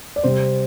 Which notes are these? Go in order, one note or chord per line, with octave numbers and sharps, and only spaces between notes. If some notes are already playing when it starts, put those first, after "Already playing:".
D5
C3 G3 C4 C5